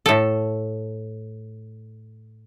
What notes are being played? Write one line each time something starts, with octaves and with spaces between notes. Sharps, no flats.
A2 A4